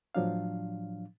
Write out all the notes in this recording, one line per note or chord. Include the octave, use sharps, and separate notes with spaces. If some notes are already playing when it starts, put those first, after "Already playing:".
A2 F3 F#3 D4 F5